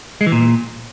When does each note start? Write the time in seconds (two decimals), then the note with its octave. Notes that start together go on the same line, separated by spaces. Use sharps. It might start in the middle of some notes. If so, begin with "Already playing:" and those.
0.21 G#3
0.27 E3
0.32 A#2